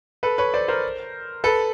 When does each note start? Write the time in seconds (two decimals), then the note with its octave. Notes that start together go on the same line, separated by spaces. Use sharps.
0.23 A4 B4
0.38 B4 C#5
0.54 C5 D5
0.68 A#4 C5
1.44 A4 B4